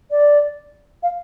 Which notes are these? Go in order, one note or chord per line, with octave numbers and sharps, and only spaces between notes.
D5
F5